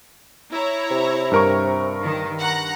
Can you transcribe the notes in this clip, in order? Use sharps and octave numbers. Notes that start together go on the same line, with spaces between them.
E4 C#5 A#5
C3
G2 A#4 C#6
D#3
F#5 A#5